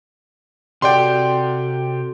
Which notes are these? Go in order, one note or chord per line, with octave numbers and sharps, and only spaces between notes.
C3 F#4 G4 A4 D5 F#5 G5 C6